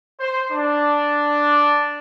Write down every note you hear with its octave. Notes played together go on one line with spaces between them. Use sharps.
C5
D4